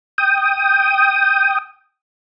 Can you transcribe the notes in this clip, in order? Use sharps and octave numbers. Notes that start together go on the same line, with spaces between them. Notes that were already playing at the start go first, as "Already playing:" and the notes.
G5 D#6